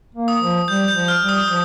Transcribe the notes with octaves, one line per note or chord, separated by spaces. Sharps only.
A#3
D#6
F3
G3 G6
G6
F3
F6
G3
D#6
F3 D#6